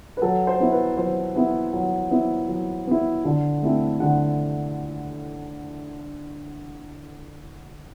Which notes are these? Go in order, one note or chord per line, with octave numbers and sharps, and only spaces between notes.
B4
F#3 A4
C5
B3 E4
B4
F#3 C5
B3 E4
F#3
B3 E4
F#3
B3 E4
D3
A3 C4 E4
D3 F#5